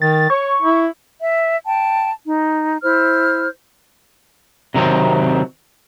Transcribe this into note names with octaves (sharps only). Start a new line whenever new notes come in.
D#3 A6
C#5 C#6
E4
E5
G5 A5
D#4
E4 C5 F6
C3 D#3 F#3 C4